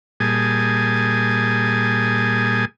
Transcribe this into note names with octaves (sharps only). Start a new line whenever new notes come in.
A#2 G3 G#4 G#5 A5 D#6